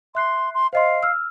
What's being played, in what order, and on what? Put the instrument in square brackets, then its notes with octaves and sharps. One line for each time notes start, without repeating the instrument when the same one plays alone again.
[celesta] E5 F#6 C7 [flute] C6
[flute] C6
[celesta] C5 D#5 C6 [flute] F5
[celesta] E6 F6